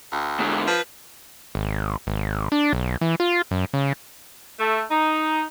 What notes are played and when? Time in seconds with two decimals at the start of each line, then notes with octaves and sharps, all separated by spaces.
0.12 D2
0.40 G#2 D3
0.68 F3 B4
1.55 G#1
2.07 G#1
2.52 D4
2.73 B1
3.01 E3
3.20 F4
3.51 F#2
3.74 C#3
4.60 A3
4.91 D#4